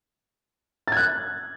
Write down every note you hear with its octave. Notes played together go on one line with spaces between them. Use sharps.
F#6 G#6 A6